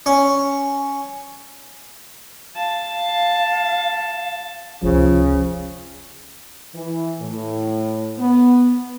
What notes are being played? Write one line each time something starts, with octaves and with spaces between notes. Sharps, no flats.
C#4
F5 A5
F1 C#2 C#3 F3
E3
A2
B3